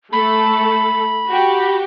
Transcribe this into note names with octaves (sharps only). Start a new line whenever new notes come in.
A3 A4 B5
F#4 G4